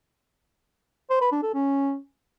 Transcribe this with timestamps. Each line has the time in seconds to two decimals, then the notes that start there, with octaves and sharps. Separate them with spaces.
1.10 C5
1.21 B4
1.32 D4
1.43 A4
1.54 C#4